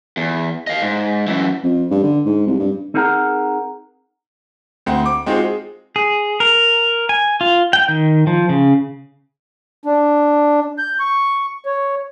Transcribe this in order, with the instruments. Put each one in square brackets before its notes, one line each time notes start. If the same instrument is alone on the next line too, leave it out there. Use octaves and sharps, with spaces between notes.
[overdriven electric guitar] E2
D#5 F5
G#2
F#2 E3
[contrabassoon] F2
G2
D3
G#2
C2
G2
[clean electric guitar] C4 D#4 G#4 A#4 F#5 A#5
[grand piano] D2 C4 F#5
D6
G#3 C4 D#4 F4 F#4 C5
G#4
[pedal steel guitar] G#4
A#4
G#5
F4
G5
D#3
F3
C#3
[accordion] D4
G6
C#6
C#5